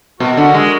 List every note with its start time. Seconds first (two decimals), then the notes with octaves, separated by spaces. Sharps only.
0.20 B2 F#4 A#4
0.37 D3
0.54 G#3